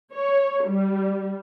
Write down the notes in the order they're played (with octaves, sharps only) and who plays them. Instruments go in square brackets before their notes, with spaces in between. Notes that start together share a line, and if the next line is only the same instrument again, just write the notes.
[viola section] C#5
G3